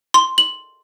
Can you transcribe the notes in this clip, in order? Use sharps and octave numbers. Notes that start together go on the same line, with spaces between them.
C6
F#7